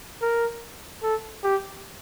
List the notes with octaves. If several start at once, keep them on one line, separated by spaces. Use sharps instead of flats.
A#4
A4
G4